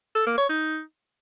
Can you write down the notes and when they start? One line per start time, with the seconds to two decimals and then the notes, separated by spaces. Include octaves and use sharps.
0.15 A4
0.26 A#3
0.38 C#5
0.49 D#4